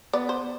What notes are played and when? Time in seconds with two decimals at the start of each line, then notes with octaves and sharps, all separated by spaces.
0.13 B3 D5
0.29 C5